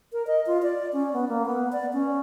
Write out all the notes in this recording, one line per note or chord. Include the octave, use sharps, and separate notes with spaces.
A#4
D#5
F4
D5
C#4
B3
A#3
B3
D5
C#4